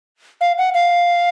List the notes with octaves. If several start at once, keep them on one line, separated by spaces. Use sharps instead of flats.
F5
F#5
F5